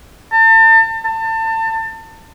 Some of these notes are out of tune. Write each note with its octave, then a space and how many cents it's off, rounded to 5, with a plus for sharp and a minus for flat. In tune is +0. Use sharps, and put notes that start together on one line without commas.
A5 +35
A5 +30